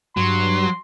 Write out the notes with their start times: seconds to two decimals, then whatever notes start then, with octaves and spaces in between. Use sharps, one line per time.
0.17 G2 F#3 C6